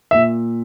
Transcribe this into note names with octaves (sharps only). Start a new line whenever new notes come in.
A#2 E5